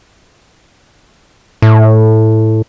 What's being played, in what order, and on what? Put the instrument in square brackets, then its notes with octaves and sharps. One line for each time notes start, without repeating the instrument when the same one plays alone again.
[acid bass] A2